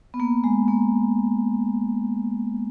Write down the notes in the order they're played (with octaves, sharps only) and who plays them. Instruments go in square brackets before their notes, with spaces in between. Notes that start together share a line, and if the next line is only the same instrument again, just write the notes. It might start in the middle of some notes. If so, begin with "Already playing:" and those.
[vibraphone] B3
A#3
G#3
A#3